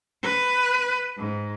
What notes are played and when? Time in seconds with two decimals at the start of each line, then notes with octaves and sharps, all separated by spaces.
0.23 B4
1.17 G#2